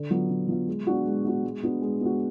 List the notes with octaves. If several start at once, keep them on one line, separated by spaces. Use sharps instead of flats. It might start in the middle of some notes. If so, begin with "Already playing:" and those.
Already playing: D3
F#3 B3 F4
D3
F#3 B3 F4
G#3
B3 D4 F#4
G#3
B3 D4 F#4
G#3
B3 D4 F#4
G#3
B3 D4 F#4